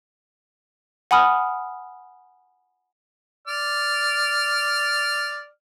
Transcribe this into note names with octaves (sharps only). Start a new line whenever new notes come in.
F#5 G#5 B5 D#6 F6
D5 F6